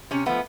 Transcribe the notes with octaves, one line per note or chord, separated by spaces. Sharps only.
C3 C#4
F3 A3 B3